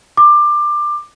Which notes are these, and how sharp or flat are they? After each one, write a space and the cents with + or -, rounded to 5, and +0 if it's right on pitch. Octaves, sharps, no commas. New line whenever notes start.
D6 +20